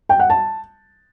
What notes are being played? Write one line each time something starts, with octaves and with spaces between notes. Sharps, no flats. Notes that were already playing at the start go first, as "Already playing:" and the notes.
G5
F#5
A5